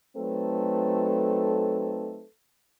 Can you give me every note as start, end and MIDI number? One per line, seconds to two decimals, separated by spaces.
0.16 2.23 54
0.16 2.23 57
0.16 2.23 60
0.16 2.23 63
0.16 2.23 69
0.16 2.23 71